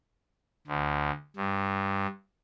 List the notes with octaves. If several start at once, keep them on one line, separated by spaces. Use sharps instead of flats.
D2
G2